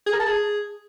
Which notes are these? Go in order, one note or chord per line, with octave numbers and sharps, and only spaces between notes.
G#4
A#4
A5
G#4